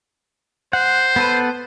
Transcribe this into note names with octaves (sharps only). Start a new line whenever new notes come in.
C5 F#5
B3 A4 B4